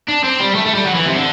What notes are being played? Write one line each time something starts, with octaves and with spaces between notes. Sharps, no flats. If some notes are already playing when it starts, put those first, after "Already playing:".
D4
C4
G3
A3
A3
G3
F#3
E3
C3
D3